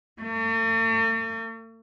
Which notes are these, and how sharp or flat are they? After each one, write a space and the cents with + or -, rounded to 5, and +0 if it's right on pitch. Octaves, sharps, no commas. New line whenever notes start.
A3 +45